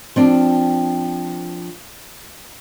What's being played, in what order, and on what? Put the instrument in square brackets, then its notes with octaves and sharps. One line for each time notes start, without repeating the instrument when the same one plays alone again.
[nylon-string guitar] F3 C4 D4